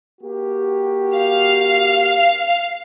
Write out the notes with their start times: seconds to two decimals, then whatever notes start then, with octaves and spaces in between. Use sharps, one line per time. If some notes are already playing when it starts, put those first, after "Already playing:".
0.21 A#3 F#4 G4
1.17 F5